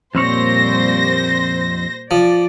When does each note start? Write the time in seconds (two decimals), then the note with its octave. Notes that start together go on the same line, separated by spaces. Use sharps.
0.15 F2 A#2 G3 C4 C5 C#5 A#6
2.11 F3 D5